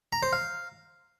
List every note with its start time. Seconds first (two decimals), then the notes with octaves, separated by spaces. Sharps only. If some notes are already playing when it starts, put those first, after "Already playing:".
0.13 A#5
0.23 C5
0.33 F5